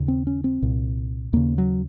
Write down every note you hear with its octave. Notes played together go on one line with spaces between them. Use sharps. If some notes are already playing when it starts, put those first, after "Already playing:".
Already playing: D#2 C#3
C4
C#4
C4
C2 A#2
D#2 C#3 A#3
F#3